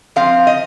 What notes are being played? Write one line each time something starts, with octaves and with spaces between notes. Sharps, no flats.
F3 C4 F5
D#5